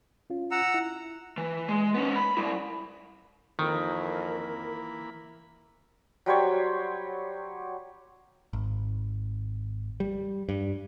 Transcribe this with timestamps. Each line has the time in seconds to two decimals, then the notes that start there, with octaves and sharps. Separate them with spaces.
0.30 C#4 F4
0.51 F#5 A#5 E6
0.74 E4
1.38 E3
1.68 G#3
1.94 B3 C#4
2.16 B5
2.37 G3 E4
3.59 F2 D#3 E3 A#3 A#4 B5
6.26 F#3 G3 C5 C#5
8.53 G#1
10.00 G3
10.49 G2